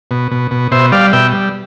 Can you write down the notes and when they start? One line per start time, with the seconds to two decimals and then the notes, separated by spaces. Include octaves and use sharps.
0.11 B2
0.32 B2
0.51 B2
0.72 B2 C5 E5
0.92 G3 D5 F5
1.13 B2 E5 G5
1.33 G3